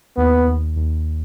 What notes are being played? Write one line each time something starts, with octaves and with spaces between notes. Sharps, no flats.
D#2 B3
D#2
D#2